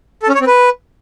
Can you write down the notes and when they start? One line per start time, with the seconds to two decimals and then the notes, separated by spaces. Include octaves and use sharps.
0.23 A4
0.29 C#4
0.35 C#5
0.41 C4
0.47 B4